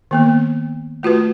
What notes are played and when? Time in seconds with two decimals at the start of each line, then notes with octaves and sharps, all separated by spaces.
0.11 D#3 A#3 B3
1.03 A3 F4 F#4 B4